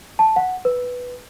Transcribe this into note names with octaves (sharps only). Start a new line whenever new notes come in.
A5
F#5
B4